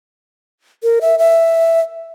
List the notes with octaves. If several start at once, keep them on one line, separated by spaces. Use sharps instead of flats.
A#4
E5
E5